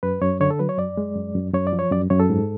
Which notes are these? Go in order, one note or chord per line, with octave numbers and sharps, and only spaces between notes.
F#2 B4
F#2 C#5
D3 C#5
A4
F#3 B4
C#5
F#2 D5
G#3
F#2
F#2
F#2 C#5
D5
F3
C#5
F#2 D5
F#2 C#5
A4
G#2